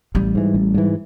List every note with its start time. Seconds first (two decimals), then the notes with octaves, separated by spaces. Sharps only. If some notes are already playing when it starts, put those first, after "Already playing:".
0.15 A1 G3
0.35 G#2 E3
0.54 A1
0.74 G#2 E3